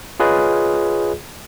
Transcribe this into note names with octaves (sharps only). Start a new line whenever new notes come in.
F4 G#4 B4 C#5 D#5